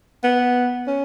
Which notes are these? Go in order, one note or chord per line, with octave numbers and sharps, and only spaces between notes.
B3
C#4